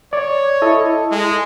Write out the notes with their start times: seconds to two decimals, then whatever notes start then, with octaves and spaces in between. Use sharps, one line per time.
0.13 C#5 D5
0.62 E4 A4 D#5
1.11 G#3